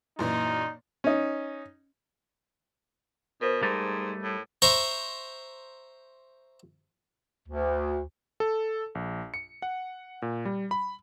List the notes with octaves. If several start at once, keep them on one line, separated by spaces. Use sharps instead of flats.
F#2 A#2 E3 D#4
C#4 D#4
B2 A#4 C5
G#2 G3 A3 D#4
A2
C5 E5 A#5 C#6
D2
A4
A#1
C#7
F#5
A#2
G3
B5